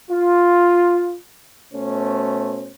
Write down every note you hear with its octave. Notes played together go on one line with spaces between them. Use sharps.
F4
B2 A3 C#4 C5